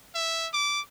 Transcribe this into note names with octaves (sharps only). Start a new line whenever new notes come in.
E5
D6